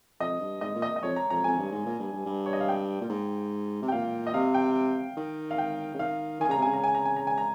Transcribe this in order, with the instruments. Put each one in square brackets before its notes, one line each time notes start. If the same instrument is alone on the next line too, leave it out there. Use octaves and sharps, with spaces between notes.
[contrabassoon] F2 [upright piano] D#5
[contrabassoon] G2
[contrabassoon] G#2 [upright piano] D#5
[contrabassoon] A#2
[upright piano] D#5
D#5
[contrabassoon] F2 [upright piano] C#5
[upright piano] A#5
[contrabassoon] F2 [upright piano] A#5
[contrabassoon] F2 [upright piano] G#5
[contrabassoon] G2
G#2
A#2
G2
G2
G2
[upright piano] C#5
D#5
F5
G5
[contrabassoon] A#2
G#2
C3
[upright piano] G5
[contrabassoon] A#2 [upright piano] F5
[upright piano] D#5
[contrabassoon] C3 [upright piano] F5
[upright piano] G5
[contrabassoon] D#3
[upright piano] F5
G5
[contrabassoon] C#3
[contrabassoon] D#3 [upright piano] F5
[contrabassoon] D#3 [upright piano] G#5
[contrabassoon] C#3 [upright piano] A#5
[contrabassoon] C3
[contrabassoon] C#3 [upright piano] G#5
[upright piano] A#5
G#5
A#5
G#5
A#5
G#5
A#5